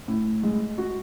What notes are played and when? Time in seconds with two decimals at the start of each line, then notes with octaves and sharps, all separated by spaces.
0.08 A2
0.43 G#3
0.78 F#4